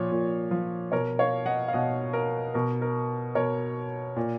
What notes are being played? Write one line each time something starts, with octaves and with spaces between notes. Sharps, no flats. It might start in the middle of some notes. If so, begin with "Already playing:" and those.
Already playing: A#2 F3 C#5
A#2
F3
B2 A#4 C#5
C#5 F5
D#5 F#5
F5
B2 D#5 F#5
A#4
B2 A#4
A#4
B2 A#4 C#5
A#2